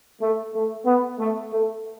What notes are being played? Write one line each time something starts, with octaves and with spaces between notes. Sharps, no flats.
A3
A3
B3
A3
A3